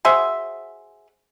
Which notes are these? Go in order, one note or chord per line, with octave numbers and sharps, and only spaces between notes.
F#4 G#4 C5 E5